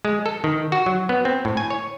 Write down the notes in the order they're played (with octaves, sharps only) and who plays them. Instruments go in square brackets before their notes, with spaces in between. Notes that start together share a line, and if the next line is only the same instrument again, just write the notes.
[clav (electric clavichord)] G#3
A4
D#3
F#4
F#3
B3
C4
A2
G#5
C#5